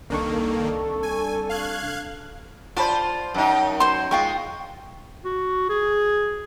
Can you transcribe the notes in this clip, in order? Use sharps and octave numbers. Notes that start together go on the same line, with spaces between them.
C2 D#3 A#3 D4 A4 C#6
G#5
F5 F#6 G#6
F4 C5 D5 A5 B5
F#2 D#4
C5 C6
G#3 F4 G5 C#6
F#4
G#4